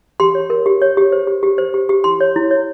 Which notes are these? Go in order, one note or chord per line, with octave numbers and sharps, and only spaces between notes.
G4 C6
C#5
A#4
G4
C#5
G4
C5
G4
G4
C5
G4
G4
E4 C6
C#5
E4
C#5